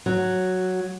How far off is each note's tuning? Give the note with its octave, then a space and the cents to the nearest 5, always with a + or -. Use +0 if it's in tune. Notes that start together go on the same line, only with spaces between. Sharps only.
F#3 +0